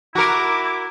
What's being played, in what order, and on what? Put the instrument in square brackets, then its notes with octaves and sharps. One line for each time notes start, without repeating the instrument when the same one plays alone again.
[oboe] E4 [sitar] F#4 A#4 [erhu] D6